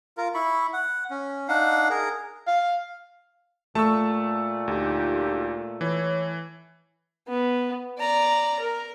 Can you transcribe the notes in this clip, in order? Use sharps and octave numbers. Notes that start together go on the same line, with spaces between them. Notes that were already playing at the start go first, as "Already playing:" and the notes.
F4 A#4
E4 B5 C#6
F#5
C#4
D4 D#4 F5 F#5
G#4 A#4
F5
A#2 A3 A5 C#6 E6
D2 D#4 F4 G4
E3 E4 C#5
B3
D5 A#5
A#4